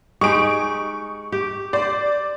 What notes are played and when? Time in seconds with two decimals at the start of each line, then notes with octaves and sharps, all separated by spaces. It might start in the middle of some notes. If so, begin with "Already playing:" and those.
0.21 G#3 D#4 G4 C#6 D7
1.32 G4
1.73 C5 D5